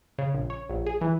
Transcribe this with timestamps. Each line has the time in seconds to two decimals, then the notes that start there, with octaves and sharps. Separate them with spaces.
0.18 C#3
0.34 A#1
0.50 C#5
0.70 A#1
0.86 G#4
1.01 E3